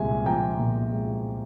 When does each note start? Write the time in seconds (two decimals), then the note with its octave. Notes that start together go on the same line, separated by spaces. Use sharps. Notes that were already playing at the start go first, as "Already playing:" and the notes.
Already playing: C2 A#2 G#3 G#5
0.26 F3 G5 A#5
0.59 A#2
0.92 G#3